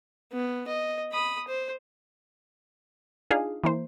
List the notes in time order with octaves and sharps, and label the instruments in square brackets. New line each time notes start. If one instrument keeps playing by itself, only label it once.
[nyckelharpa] B3
D#5
B5 D#6
C5
[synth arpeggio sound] D4 D#4 F4 G#4 F5
E3 A#3 C5